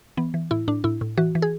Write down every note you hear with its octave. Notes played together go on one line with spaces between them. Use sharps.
E3 B3
E3
A2 E4
A2 D4
A2 E4
A2
E3 F#4
E3
G#4